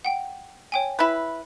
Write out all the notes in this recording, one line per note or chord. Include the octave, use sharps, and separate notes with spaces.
F#5 G5
C#5 G5 G#5
E4 B4